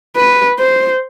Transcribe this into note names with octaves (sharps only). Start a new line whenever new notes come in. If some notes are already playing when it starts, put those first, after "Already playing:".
B4
C5